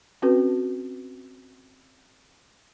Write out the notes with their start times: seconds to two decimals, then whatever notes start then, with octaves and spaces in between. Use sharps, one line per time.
0.22 C4 C#4 F#4 A4 B4